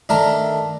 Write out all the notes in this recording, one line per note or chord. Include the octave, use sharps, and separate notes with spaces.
D#3 A3 D4 A#4